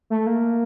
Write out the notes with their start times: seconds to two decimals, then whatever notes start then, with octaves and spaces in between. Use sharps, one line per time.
0.10 A3
0.27 A#3